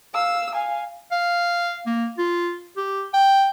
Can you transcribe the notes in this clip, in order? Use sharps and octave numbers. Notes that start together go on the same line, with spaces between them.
F5 E6
F5 G#5
F5
A#3
F4
G4
G5